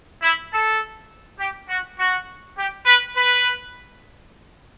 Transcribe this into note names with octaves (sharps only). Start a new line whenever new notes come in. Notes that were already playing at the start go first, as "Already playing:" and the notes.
E4
A4
G4
F#4
F#4
G4
B4
B4